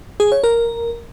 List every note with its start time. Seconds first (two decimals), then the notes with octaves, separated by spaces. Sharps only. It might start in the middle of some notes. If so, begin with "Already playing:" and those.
0.20 G#4
0.32 C#5
0.43 A#4